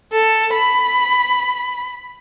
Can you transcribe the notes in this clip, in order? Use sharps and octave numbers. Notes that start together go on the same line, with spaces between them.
A4
B5